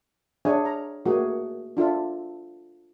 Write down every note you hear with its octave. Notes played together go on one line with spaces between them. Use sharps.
D4 G#4 C#5 E5 F#5 G#5
A#5
A3 A#3 F#4 G#4
D4 F4 A4 E5